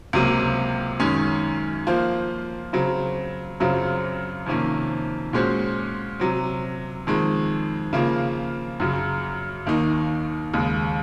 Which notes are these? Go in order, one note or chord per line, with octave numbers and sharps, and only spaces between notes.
C#2 C3 F#3 A#3
F#2 D#3 G#3 C#4 G#4
F3 A#3 F4 C5
C#3 F#3 C4
F#2 C#3 F#3 C4 F4
F2 C3 D#3 A#3 C#4
A#2 G#3 C#4 F#4 C5
C3 F#3 C4
F2 D#3 G#3
C#3 F3 A#3 F4
F#2 C#3 F#3
D#2 D#3 A#3 D#4
D#2 C#3 G#3